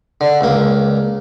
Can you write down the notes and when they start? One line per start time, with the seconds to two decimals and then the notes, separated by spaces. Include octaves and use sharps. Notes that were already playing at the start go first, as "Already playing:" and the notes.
0.21 D3
0.41 C#2 A#3